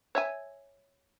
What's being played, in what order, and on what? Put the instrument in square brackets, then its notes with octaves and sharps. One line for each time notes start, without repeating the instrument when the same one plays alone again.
[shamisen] C#5 E5 G#5